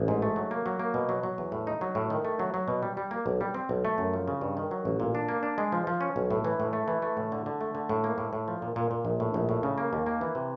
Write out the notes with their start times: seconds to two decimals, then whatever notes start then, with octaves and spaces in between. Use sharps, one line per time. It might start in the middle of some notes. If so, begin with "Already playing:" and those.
Already playing: A1
0.08 G#2
0.22 A3
0.36 F#3
0.51 A#3
0.66 F#3
0.79 A#3
0.94 B2
1.09 F#3
1.23 F#3
1.38 E2
1.52 A2
1.67 D#4
1.81 F#3
1.95 A2
2.10 D#3
2.25 A3
2.39 F#3
2.54 F#3
2.68 B2
2.83 G3
2.97 G3
3.11 A#3
3.26 B1
3.41 G3
3.54 C4
3.69 B1
3.85 A3
3.98 F#2
4.14 F3
4.28 C#3
4.41 G2
4.57 D#3
4.71 F#3
4.85 A1
5.00 A#2
5.15 D4
5.29 A#3
5.43 D4
5.58 G#3
5.72 F3
5.87 F3
6.01 C#4
6.16 B1
6.31 A2
6.45 E3
6.60 A2
6.73 A3
6.88 E3
7.02 A3
7.17 A2
7.32 D3
7.46 D3
7.61 A3
7.75 D3
7.89 A2
8.04 A#3
8.18 A2
8.33 A2
8.48 F3
8.62 A#2
8.76 A#2
8.91 A#2
9.05 A#1
9.20 A2
9.34 A#1
9.49 A2
9.63 C#3
9.78 A#3
9.93 D#2
10.06 A#3
10.21 E3
10.35 C3